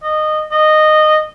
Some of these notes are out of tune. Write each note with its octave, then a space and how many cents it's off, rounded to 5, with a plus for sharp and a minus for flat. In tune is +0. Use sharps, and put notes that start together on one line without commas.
D#5 -15
D#5 -15